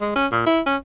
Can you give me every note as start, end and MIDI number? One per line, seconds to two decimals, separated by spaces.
0.01 0.15 56
0.16 0.27 61
0.32 0.46 46
0.46 0.61 64
0.66 0.76 61